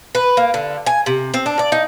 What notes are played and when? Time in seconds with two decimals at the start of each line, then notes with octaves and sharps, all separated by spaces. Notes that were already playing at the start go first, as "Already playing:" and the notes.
0.15 B4
0.37 A#3
0.54 D3
0.87 G#5
1.06 C3
1.34 C4
1.46 D4
1.59 D5
1.72 D#4